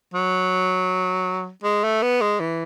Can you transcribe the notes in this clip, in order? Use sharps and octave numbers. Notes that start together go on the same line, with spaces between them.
F#3
G#3
A3
B3
G#3
E3